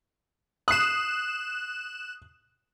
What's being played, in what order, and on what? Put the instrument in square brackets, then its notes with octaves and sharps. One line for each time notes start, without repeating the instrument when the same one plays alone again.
[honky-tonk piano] D#6 C7 [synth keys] F#6 E7